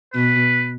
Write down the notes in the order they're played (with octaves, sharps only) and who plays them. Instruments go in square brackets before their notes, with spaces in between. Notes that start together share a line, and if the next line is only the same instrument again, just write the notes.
[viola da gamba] B2 [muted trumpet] B4